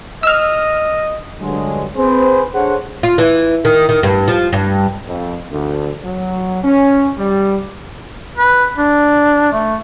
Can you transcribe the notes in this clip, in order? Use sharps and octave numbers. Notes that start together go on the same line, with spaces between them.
D#5 E6 F6
G2 D3 F#3 G#3
C4 G#4 B4 C5
D4 G#4 A4 C5 C#5 F#5
F4
E3
D#3
D#3
G2
F3
G2
F2
D2
F#3
C#4
G3
B4
D4
A3